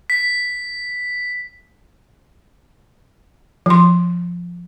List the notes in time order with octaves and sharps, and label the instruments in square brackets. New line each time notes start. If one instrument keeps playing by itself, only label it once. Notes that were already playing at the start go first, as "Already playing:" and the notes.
[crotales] B6
[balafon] F3 C6